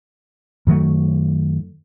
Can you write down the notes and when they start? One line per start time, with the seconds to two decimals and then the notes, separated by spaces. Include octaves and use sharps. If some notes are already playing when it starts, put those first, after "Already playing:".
0.67 F#2 D#3 F#3 A3